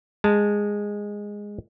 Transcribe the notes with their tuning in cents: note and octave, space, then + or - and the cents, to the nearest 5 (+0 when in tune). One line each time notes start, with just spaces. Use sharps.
G#3 -10 A5 +0